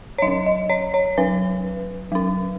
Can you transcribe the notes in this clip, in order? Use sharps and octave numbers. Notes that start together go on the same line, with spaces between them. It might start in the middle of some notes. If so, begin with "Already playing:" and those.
C#5
F#3 C#4 D#5
D#5
C#5
C#5
F#3 C#4 B4
F#3 C#4